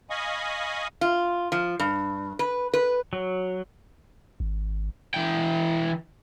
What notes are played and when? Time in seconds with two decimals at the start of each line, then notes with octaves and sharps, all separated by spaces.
0.10 D#5 F5 G#5 B5 C#6 D#6
1.01 F4
1.52 F3
1.80 G2
2.39 B4
2.74 B4
3.13 F#3
4.40 G#1
5.14 E3 G5